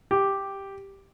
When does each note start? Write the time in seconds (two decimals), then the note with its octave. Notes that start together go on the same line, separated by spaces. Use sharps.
0.11 G4